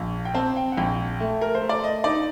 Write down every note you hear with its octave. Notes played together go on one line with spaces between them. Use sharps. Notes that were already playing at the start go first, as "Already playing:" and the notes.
Already playing: A#1
G5
C4 A5
G5
F#5
A#1 G5
A3
A#4
C5
A3
D5
D#5
D#4 D5